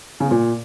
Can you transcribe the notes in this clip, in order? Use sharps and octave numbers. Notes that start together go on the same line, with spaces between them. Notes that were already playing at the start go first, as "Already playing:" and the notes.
C#3
B3
A#2